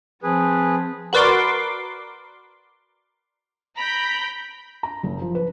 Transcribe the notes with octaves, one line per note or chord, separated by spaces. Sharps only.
F3 C4 G#4 B4
F#4 A#4 B4 D5 C6 D6
A#5 B5 G6 B6 D7
A#5
F#1
F3
B4